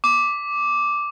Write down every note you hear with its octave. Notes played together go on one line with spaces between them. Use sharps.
D6